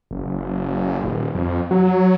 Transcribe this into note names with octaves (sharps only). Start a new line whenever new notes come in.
F#1
D#1
F2
F#3